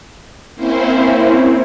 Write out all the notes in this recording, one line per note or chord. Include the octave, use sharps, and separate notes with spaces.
A#3 C4 C#4 E4 C5